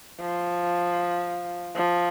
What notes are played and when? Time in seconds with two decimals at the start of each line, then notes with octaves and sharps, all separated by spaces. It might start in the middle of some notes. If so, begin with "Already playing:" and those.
0.21 F3
1.76 F3